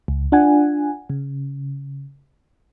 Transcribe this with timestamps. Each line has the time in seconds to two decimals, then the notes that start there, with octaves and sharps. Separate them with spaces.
0.08 C#2
0.32 D4 F4 F#5 G#5
1.10 C#3